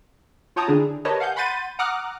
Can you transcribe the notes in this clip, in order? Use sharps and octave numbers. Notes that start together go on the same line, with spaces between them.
F4 C#5 G5 A5 A#5 D#6
D3 D4 E4 G#4
G4 A#4 B4 C#5 D#5 A5
F5 F#5 G#5 G6
F#5 B5 C6 G6 A6 D#7
F#5 A#5 D6 D#6 F6 F#6